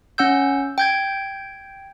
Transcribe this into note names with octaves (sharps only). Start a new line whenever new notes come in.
C#4 F#5 E6 G6
G5 G6 G#6